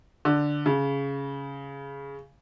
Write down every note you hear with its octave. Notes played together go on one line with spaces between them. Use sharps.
D3
C#3